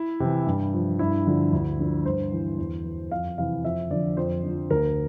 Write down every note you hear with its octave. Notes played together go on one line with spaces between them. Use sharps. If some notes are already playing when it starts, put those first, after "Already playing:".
Already playing: E4
C3 E3
G2
F3
G2 E4
D3 F3
D2
D3 F3
G2 C5
E3
E2
E3
F2 F5
C3 E3 F5
F2 E5
D3 F3 D5
F2 C5
D3 F3
D2 A#4